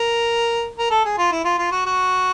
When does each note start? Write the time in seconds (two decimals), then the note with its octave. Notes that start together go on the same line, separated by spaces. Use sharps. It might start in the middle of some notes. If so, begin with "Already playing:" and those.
Already playing: A#4
0.78 A#4
0.90 A4
1.05 G#4
1.18 F4
1.32 E4
1.44 F4
1.58 F4
1.72 F#4
1.86 F#4